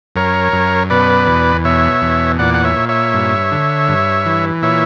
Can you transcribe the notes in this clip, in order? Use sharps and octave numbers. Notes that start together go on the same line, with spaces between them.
F#2 A#4 C#5
F#2
B2 B4 D5
E2
B2 C#5 E5
E2
A#2 D5 F#5
F#5
C#5 E5
A#2
C#5 E5
G2
D3
G2
E3
A#2 C#5 E5